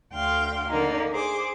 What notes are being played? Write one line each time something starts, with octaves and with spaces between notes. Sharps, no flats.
D2 F5 G5 C6
D3 A#3 D#4
G#4 C5 D6